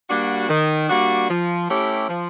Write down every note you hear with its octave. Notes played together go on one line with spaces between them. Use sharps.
G3 A#3 D4 F#4
D#3
G3 A#3 D4 F#4
F3
A3 C#4 E4 G4
F3